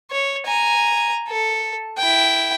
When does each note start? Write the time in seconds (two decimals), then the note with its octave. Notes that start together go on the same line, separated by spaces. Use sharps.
0.11 C#5
0.46 G#5 A#5
1.28 A4
1.98 E4 G5